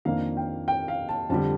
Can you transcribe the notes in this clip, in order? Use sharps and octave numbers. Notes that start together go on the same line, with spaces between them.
F2 D#3 A#3 D4 F5
G5
G5
F5
A5
F2 D3 G3 A5